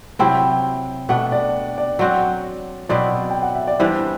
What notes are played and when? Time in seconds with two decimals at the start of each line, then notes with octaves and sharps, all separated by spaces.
0.19 C3 F#3 C4 E4 G5
1.09 B2 A3 D4 F#5
1.32 D5
1.78 D5
1.99 F#3 C4 F#4 D5
2.89 B2 F#3 C4 E4 D5
3.30 G5
3.42 F#5
3.54 E5
3.67 D5
3.80 E3 G3 D4 C5